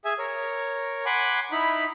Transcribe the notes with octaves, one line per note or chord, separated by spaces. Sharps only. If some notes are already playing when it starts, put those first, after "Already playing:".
G#4 E5 G#5
A#4 C#5
F#5 G#5 B5 C6 D6
D#4 E4 B5